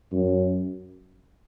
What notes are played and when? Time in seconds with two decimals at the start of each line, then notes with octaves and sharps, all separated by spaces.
0.12 F#2